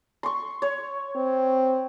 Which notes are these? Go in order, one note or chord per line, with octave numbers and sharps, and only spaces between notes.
C6 C#6
C#5
C4